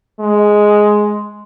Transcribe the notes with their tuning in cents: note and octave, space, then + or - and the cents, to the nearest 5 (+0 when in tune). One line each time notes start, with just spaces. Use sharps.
G#3 +5